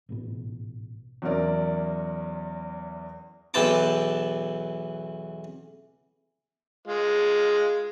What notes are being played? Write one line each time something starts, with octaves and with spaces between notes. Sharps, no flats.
A1 G#2 B2
E2 F#3 C#4 E4 A#4 D5
B1 E2 E3 G5 A5 D6
G#3 F4